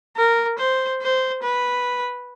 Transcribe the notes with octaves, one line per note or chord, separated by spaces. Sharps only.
A#4
C5
C5
B4